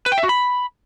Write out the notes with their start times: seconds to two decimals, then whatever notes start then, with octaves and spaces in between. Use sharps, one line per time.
0.06 B4
0.12 G5
0.18 E5
0.23 F#4
0.29 B5